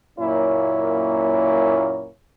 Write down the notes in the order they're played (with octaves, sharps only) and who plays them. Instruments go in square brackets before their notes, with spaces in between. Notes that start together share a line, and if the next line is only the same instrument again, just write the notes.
[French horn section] F#2 A#2 A#3 C#4 E4 C#5